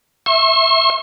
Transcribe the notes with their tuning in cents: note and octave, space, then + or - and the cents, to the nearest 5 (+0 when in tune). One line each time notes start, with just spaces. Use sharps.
E5 +0 C#6 -45